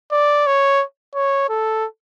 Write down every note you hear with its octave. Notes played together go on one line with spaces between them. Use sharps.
D5
C#5
C#5
A4